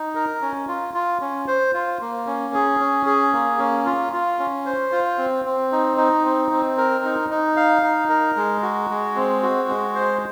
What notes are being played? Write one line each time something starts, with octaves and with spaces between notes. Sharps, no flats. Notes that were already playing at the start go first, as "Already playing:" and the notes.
Already playing: D#4
A#4
C#4
F4
F4
C#4
C5
F4
A#3
C#4
G#4
C#4
G#4
A#3
C#4
F4
F4
C#4
C5
F4
C4
C4
D#4
D#4
C4
C4
A#4
D#4
D#4
F5
D#4
A#4
G#3
F#4
G#3
C4
F#4
G#3
C5